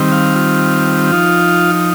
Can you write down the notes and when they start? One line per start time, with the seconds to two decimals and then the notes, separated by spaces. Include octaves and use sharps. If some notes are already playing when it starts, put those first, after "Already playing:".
Already playing: D#3 G3 C4
0.12 F5
0.36 F4
1.12 F3 D#4